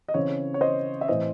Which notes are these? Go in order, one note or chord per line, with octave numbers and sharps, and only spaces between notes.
D#5
C#3 E3 C4 C#5
C#5
C5 D#5
E5
A2 E3 C4 C5 D#5